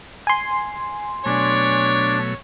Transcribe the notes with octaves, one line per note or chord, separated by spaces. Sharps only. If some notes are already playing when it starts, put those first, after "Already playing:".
G#5 C6
B2 F#3 A3 D4 C#5 D5 G#6